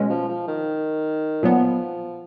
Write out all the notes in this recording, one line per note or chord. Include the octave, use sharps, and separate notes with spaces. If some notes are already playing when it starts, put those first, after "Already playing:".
Already playing: B2 G#3 C#4
F3
F3
D#3
A#2 F3 F#3 B3